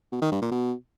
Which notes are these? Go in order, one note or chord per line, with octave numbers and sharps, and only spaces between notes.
B2
D#3
G2
A#2
B2